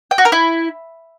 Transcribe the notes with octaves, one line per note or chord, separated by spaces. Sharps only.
G5
F#4
A#4
E4